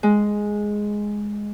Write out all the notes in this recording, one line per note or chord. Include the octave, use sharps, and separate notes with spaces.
G#3